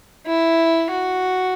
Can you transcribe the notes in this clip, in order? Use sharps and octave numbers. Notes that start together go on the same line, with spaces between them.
E4
F#4